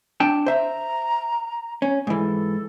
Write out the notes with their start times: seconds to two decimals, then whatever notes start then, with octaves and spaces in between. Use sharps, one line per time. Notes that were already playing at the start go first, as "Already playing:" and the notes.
0.20 D4 G5 A5
0.46 C5 E5 A#5
1.82 C#4
2.07 G#2 E3 A4